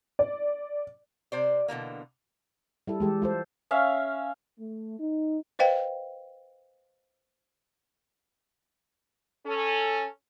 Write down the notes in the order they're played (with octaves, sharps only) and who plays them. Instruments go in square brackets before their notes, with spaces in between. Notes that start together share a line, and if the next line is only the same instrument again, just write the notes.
[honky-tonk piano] D5
[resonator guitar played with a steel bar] C3 C5 D5
B2 D3 E3 A#3
[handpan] G3 E4 A4
[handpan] E3 G4 A4 [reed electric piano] G#3
[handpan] F4 A4 C5
[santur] C#4 E5 F5
[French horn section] A3
D#4
[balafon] B4 C5 D#5 F5 G5
[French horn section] C#4 A4